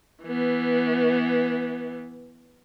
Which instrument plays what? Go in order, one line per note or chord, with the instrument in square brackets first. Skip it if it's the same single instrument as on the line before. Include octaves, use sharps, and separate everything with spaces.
[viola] E3 B3